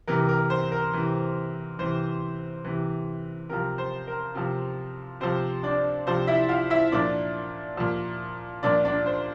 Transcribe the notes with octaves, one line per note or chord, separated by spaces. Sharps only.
C3 E3 A#4
A#4
C5
A#4
C3 E3
C3 E3 C5
C3 E3
C3 F3 A#4
C5
A#4
C3 F3
C3 F3 C5
D4 D5
C3 F3 C5
E4 E5
F4 F5
E4 E5
A#2 F3 D4 D5
A#2 F3
A#2 F3 D4 D5
D4 D5
C5